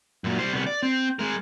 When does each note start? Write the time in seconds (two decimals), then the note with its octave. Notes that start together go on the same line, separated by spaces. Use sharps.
0.24 F#2 A#2
0.39 G3 C5
0.53 C2 B3
0.66 D5
0.83 C4
1.19 G#3 A#4